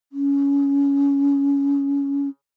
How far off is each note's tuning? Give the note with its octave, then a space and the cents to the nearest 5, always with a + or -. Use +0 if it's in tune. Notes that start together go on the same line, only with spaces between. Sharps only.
C#4 +15